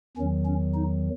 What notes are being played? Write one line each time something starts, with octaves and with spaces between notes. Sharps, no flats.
E2 D#3 F#3 C#4
C#4
D#4